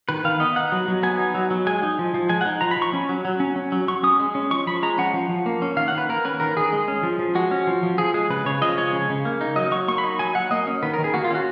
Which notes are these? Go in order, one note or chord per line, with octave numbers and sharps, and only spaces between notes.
D#3 B4
D#3 F5
B3 D#5
D#4 F#5
F#3
F#3
B3 G#5
D#4
F#3
F#3
G#3 G#5
D#4
F3
F3
G#3 G#5
F#5
D#4
F3 A#5
B5
F3 C#6
C#4
F#3
F#3
C#4
C#4
F#3
F#3 C#6
C#4 D#6
G#3
C#4
F3 C#6
F3 B5
G#3 A#5
C#4 F#5
F3
F3
A#3
C#4
D#3 F5
F#5
D#3
B4
A#3 A#4
C#4 B4
D#3 A#4
D#3 G#4
G#3
C#4
F3
F3
G#3 F#4
C#4
F3
F3
F3 G#4
G#3 G#4
C#3 B4
C#3 C#5
F3 D#5
G#3 C#5
C#3
C#3
A#3
D#4
F#3 D#5
F#3 C#6
A#3 C#6
B5
D#4
F#3 G#5
F#3 F#5
A#3 D#5
C#4
D#3 B4
A#4
D#3
G#4
A#3 F#4
F4
C#4 F#4